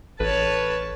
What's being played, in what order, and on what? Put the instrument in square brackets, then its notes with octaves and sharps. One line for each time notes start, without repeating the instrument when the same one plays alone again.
[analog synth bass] A1 [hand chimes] A4 [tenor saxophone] B4 [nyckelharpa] C#5 A5